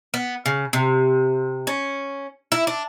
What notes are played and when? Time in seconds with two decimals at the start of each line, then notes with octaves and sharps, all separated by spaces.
0.14 B3
0.46 C#3
0.73 C3
1.67 C#4
2.52 E4
2.67 D4